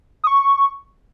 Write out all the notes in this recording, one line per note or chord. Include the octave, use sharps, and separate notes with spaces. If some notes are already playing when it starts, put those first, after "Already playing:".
D#6
C#6